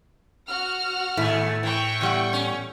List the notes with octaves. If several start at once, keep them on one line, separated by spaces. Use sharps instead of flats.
F#4 F#5 F6
D#2 A2 A3 E4
E3 G5 C#6
E2 G3 F#5
C#4